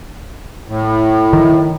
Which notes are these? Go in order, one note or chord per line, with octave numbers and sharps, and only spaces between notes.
A2
D#3